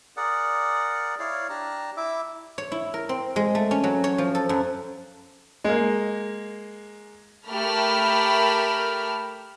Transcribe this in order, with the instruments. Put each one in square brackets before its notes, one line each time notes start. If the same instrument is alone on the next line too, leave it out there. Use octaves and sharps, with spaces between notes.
[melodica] G#4 A#4 D5 F#5
E4 C#5 D5 F5
D4 G4 A5 A#5
E4 E5 D6
[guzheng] C#5
E4
A#4
C4
G#3
A3
C#4
F#3
C#5
F3
A4
F#2
[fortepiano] G#3 A#3
[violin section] A3 G4 A#4 A5 B5 F6